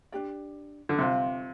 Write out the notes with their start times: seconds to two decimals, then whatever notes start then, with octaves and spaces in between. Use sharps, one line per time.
0.12 D4 G4 D5
0.89 D3
0.98 C3 F4 C5 F5